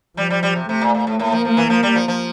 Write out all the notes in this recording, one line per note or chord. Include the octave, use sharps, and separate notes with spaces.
F3 G3
G3
G3
C3
C3 A3
A#2
A#2
A2
A2 A#3
F3
F3
E3
F3
G3
F3
F3